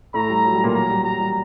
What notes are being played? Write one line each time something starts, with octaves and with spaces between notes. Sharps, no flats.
A2 A3 A#5
G3
F#3
G3
A#2 A#3
F#3 A#5
G3
G3 A#5
G3